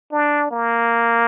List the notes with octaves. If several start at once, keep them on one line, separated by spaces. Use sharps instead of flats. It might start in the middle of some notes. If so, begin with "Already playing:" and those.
D4
A#3